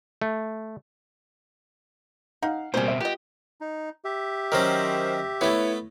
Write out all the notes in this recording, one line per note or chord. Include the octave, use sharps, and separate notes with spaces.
A3
D#4 F5 F#5
B2 G3 A#3 C4 C#4 C5
E5
B3 F4 G4 D#5
D#4
G4 E5
D#3 F#3 C#4 A#4 C5 A#6
A3 B3 E4 B4 C#5